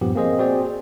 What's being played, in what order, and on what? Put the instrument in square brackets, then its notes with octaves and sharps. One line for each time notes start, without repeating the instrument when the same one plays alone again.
[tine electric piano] G2 A#2 F3 B3 G4
A#3 C4 G#4 C5 D#5
C4 F#4 G#4 C5 D5 G5
G#4